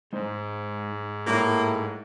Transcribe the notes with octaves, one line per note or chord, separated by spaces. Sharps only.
G#2 G#3 D#4 C5
A2 G#3 A#3 D#4 G4